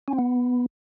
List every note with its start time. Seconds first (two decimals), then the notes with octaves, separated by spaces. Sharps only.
0.08 C#4
0.13 C4
0.19 B3